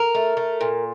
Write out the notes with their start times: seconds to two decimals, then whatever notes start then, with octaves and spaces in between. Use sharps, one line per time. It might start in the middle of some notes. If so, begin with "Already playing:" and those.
Already playing: A#4
0.15 A3
0.37 A3
0.61 A#2